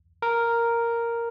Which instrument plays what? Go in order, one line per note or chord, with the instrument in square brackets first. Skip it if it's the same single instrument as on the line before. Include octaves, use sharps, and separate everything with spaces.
[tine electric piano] A#4